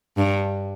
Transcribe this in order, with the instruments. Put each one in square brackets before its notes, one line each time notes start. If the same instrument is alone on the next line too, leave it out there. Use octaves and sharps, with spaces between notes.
[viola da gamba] G2